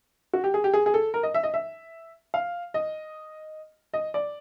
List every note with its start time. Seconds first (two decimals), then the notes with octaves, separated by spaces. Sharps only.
0.33 F#4
0.44 G4
0.54 G#4
0.64 G4
0.74 G#4
0.86 G#4
0.94 A4
1.14 A#4
1.23 D#5
1.34 E5
1.43 D#5
1.54 E5
2.34 F5
2.74 D#5
3.94 D#5
4.14 D5